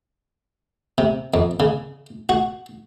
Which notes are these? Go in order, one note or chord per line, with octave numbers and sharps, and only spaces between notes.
C3
F2
C#3
F#4